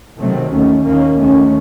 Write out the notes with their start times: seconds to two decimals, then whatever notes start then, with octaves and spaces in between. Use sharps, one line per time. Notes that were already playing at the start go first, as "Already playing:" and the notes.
0.18 C3 D#3 F#3 A3 C4
0.51 D#2 D#3 A3 C#4
0.84 D#2 D#3 A#3 C#4
1.17 D#2 D#3 A3 C#4